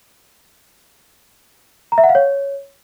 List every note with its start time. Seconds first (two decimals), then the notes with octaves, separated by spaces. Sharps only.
1.92 A#5
1.98 E5
2.03 F#5
2.09 F5
2.15 C#5